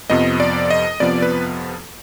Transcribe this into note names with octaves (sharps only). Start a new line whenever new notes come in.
F2 C3 F3 B3 D#5
D5
D#5
F2 C3 F3 B3 D5
B4